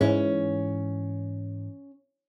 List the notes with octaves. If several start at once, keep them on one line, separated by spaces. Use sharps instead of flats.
G#2 E3 C#4